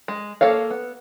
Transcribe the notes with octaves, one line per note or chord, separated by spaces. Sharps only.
G#3
A#3 A4 C#5 F5
B3